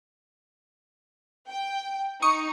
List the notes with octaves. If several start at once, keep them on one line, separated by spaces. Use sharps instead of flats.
G5
D#4 C#6 D#6 C#7